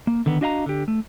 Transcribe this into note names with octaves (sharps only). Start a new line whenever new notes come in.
A#3
D3 D#3 B3
D4 F#4 D#5 F5 F#5 A#5
D3 G4
A3